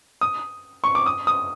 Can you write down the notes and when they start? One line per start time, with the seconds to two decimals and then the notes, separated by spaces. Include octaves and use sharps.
0.21 D#6
0.84 C#6
0.95 D6
1.06 D#6
1.27 D#6